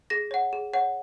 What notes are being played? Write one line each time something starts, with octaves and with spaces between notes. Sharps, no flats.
G#4 A#6
C#5 F#5
G#4
C#5 F#5